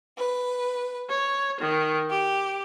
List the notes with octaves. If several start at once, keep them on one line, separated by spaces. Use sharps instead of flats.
B4
C#5
D#3
G4